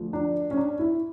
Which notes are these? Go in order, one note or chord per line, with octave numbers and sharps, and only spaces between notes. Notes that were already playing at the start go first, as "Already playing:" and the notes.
Already playing: D2 D3 F3
D4
C#4
D4
E4